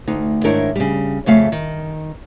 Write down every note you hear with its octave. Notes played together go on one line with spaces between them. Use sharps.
D2 D#4
G#2 D#3 D4 E4 A#4 C#5
C#3 G3
F2 C#3 A3 F5
D#3